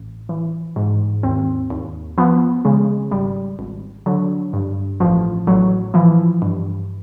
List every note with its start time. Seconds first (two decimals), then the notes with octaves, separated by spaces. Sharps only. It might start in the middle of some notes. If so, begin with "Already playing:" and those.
Already playing: A1
0.29 E3
0.76 G#2
1.23 D#2 C4
1.70 D#2
2.18 F3 B3
2.65 C#3 G#3
3.11 G#1 G3
3.59 G#1
4.06 D3 F#3
4.53 G2
5.00 A1 F3
5.47 A1 F#3
5.94 E3 F3
6.42 G2